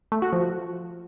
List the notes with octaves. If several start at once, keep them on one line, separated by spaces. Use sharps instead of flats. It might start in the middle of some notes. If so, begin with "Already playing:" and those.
A3
F#4
F3